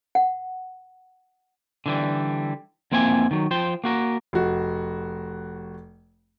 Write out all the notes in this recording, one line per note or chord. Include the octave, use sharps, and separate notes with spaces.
F#5
D3 E3 G3
F2 A#3 C4 E4 G#5
D#3 F#3
F3 C5 G5
A#3 F#4 A#4
F1 F#4